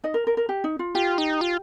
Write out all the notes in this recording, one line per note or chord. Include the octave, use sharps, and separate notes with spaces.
D#4 D#5
A#4
A#4
A#4
G4
D#4
F4
F4 G4
D#4
F4